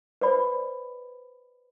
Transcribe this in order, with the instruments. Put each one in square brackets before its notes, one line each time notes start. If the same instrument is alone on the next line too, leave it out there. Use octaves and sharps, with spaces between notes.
[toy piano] B4 C5 D5 B5